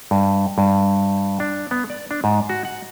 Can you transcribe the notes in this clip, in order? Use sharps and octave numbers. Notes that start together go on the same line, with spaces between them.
G2
G2
D4
B3
D5
D4
G#2
F#4
F#5